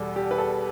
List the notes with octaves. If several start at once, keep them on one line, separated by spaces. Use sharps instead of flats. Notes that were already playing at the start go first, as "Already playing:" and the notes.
Already playing: E2 B2 G3 A4
G4
B4
A4